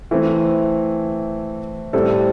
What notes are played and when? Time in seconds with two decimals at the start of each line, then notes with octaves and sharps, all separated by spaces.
0.11 E3 A3 C4
1.93 A2 G3 C4 A4